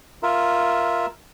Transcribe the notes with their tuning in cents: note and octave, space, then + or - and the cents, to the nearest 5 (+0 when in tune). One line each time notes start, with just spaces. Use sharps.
F4 +0 A#4 +10 E5 +0